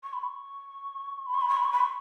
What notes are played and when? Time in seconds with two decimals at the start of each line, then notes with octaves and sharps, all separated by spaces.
0.03 C#6
0.13 B5
0.24 C#6
1.26 B5
1.34 C#6
1.41 B5
1.49 C#6
1.57 B5
1.65 C#6
1.73 B5
1.80 C#6